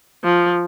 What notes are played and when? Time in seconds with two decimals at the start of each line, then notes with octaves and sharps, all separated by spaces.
0.24 F3